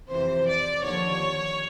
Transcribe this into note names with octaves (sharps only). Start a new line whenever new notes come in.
F2 C3 E3 C5
D5
D#2 D3 F3 C#5